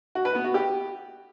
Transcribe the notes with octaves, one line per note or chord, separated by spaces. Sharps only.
F#4
B4
B3
F#4
G4